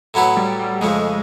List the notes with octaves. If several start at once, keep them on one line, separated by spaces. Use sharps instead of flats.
A2 F#3 B3 E4 A4
G3
G3
F2 C#3 F3 G#3 A3